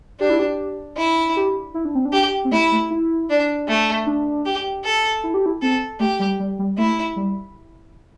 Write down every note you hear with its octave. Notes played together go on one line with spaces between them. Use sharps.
D4 G4
E4
G4
E4
G4
E4
D4
C4
D4
G4
C4
A3 E4
A3
E4
D4
A3
D4
G4
A4
E4
G4
E4
C4 A4
A3 G4
G3
G3
G3
A3 E4
G3